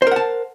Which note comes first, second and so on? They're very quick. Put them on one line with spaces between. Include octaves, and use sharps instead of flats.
C5 A#4 F#5 A5